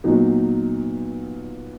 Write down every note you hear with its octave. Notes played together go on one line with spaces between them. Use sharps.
A#2 F#3 B3 D#4